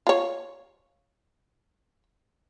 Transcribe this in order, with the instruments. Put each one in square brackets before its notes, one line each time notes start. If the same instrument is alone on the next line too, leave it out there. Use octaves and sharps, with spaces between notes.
[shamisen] F4 C#5